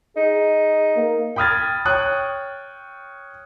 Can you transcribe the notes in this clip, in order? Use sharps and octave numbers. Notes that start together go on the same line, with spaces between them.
D#4 G#4
A#3
G5 B5 D#6 F6 G#6 A6
C#5 G5 D#6 F#6